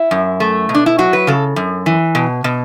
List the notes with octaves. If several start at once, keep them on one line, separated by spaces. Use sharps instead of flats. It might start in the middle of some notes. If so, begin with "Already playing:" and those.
Already playing: E4
F#2
A3
B2
D4
E4
F#3 F#4
B4
C#3 A4
F#2
E3
B2
B2